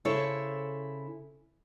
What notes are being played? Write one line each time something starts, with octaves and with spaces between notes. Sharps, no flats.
C#3 E4 A4 C5 C#5